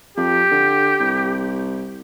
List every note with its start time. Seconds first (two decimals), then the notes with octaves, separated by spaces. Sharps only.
0.17 F2 G4
0.51 D3
1.00 C2